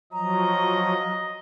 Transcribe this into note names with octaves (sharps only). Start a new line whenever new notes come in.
F3 F#3 D#5 A#5